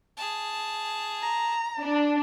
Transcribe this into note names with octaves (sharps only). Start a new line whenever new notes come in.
G#4 A5
A#5
D4